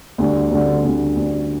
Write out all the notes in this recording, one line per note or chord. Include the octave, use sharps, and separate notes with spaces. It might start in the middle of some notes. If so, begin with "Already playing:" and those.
D2 D3 G3
D2 D3 G3
D2 D3 G3
D2 D3 G3